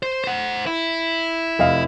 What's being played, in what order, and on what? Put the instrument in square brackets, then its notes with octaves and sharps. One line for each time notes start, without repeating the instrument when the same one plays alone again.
[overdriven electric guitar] C5
C5 F#5
E4
[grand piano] F1 D#5 F5